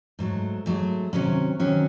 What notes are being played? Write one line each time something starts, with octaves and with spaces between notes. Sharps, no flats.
G#2 F#3 A3
G#2 F#3 A3
C3 D#3 F#3 C#4
C3 D#3 F#3 C#4